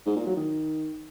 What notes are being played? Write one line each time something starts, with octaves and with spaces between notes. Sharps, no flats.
G#2
A#2
F#3
D#3